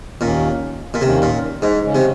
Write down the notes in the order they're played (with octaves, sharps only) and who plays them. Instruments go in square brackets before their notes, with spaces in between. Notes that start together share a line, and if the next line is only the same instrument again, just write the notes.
[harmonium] D#2 D#3 A#3 C#4 [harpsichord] A#2
[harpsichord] A#2
[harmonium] D#2 D#3 A#3 C#4 [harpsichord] C3
[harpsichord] A#2
G#2
[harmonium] C#3 G#3 C#4
[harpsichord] C3